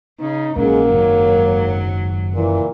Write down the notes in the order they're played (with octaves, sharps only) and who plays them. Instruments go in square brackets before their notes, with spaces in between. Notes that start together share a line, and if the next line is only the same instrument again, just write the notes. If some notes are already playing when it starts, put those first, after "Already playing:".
[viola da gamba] C#3 [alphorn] D#4
[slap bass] A#1 C#4 [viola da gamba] G#2 F#3 [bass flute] G#3 [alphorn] A#3
[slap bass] F#1 D#3 [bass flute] C#5
[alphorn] A#2 [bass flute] E3